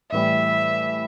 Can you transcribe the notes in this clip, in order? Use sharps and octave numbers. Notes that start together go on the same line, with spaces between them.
A2 E3 G3 E5